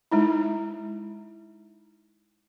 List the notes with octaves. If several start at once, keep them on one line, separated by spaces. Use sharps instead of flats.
G#3 D#4 E4